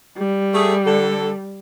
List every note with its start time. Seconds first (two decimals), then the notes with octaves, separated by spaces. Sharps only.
0.18 G3
0.54 A3 G#4
0.85 D3 A4